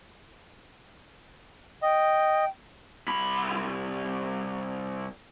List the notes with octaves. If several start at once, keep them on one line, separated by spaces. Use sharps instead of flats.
D#5 G5
C2 B5